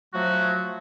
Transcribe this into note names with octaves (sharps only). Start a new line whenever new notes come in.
F3 F#3 A3 F#4